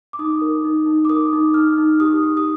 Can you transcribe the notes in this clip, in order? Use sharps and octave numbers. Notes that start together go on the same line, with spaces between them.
D6
D#4 D#6
A#4
D#4
D#4
D6
A#4 D#6
D#4
D#4 F6
D#4
G4 D#6
G4
D#6